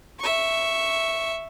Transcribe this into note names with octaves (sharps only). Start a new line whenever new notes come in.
E5 C#6